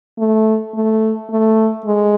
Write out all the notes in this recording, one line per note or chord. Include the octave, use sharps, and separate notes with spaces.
A3
A3
A3
G#3